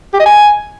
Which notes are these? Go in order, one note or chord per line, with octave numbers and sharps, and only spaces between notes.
G4
D#5
G#5